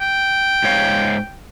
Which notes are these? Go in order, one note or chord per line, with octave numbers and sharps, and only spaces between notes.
G5
G#2 C#5 F5